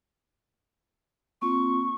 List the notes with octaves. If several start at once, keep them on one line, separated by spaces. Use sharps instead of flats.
A#3 C4 F4 C#6